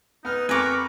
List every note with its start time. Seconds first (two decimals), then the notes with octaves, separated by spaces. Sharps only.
0.25 B3 D#4 F6
0.49 F2 A#4 B4 G#5 A#5 C#6 D6